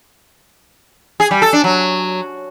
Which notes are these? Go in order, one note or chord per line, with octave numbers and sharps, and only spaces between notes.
G#4
G3
A4
D4
F#3